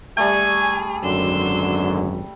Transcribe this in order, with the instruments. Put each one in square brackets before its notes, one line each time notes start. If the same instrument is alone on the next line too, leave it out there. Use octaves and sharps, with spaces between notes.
[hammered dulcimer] G3 A3 [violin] G#4 [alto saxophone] G#5
[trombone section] G#1 F#2 [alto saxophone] D3 [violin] C6 E6